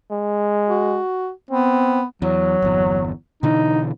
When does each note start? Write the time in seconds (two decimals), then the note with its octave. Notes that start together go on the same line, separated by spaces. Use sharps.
0.11 G#3
0.69 F#4
1.51 B3 C4
2.22 E2 F#3
2.62 G1 E2
3.43 B2 D3 E3 D#4